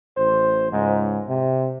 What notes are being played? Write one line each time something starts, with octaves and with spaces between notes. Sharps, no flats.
A1 C5
C#2 G#2
C3